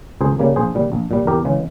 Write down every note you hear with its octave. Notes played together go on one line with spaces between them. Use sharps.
C#2 G#4 C5
C#3 G3 A#3
A#1 G#4 C5
A#2 G3
A#1
A#2 G3
E2 G4 A#4
C#3 E3 G#3